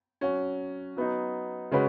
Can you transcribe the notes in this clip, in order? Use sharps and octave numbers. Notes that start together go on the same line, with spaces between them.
F#3 C#4 F#4
F#3 B3 D#4
C#3 G#3 C#4 F#4 B4